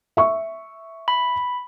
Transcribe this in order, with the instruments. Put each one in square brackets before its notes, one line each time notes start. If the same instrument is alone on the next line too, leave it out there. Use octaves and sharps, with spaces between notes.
[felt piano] E5 C#6
[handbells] B5